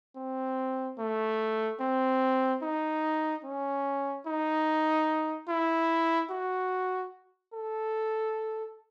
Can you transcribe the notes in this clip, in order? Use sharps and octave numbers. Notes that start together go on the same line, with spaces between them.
C4
A3
C4
D#4
C#4
D#4
E4
F#4
A4